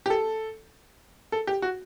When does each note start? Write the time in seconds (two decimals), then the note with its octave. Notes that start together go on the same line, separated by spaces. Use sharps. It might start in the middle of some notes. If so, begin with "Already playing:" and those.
0.06 G4
0.10 A4
1.32 A4
1.47 G4
1.62 F#4